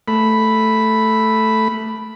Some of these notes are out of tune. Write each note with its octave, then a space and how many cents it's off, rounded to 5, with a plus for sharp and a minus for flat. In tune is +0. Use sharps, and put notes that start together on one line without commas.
A3 +0 B5 +0